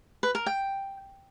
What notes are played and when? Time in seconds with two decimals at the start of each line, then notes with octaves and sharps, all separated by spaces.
0.23 B4
0.35 A#4
0.46 G5